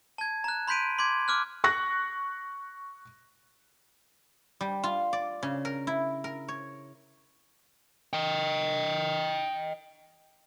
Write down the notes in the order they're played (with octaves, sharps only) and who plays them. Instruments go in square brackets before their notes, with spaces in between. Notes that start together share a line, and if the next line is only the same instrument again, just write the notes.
[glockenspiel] A5 G#6
A#5 F#6
B5 C6 G6 B6 D7 D#7
C6 D6 G#6
D6 F6 F#6
[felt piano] C#6 F#6 A#6
[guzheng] G3
F4
D5
C#3
A#4
E4
A#4
C#5
[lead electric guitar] D#5 G5